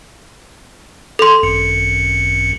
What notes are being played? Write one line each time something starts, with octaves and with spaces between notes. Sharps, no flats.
A4 C6
G#1 F#2 C#7